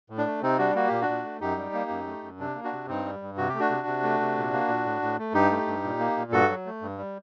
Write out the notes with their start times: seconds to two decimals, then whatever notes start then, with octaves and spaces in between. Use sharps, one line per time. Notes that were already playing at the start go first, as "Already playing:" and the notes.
0.10 A2
0.18 D4
0.26 A3
0.42 C3 C4 D#4
0.58 G3 D4 F#4
0.75 A#3 F#4
0.88 A#2 G4
1.02 D4 F#4
1.08 A#2
1.24 A3
1.40 F#2 D#4 G4
1.57 G3
1.73 A#3
1.90 F#2
2.06 A3
2.23 F#2
2.39 C3 D4
2.55 A#3
2.64 D4 F#4
2.73 C3
2.88 G2 C4 D#4
3.04 G3
3.22 G2
3.37 C3 F#4
3.49 A3 G4
3.60 D4 F#4
3.70 C3
3.87 C3
4.03 A3
4.20 C3
4.36 A#2
4.53 A#3
4.68 A#2
4.85 A2
5.02 A2
5.18 A3
5.34 G2 D#4 G4
5.51 A3
5.67 G2
5.84 A#2
5.99 A#3
6.17 A#2
6.32 G2 F#4 A4
6.49 F#3
6.66 A3
6.82 G2
6.98 G3